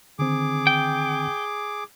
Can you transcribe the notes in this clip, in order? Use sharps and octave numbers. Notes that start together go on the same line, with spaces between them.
D3 D#3 C4 G#4 D6
G5